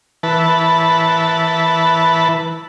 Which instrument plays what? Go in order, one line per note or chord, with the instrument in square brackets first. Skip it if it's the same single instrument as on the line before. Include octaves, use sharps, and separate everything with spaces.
[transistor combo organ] E3 B4 A5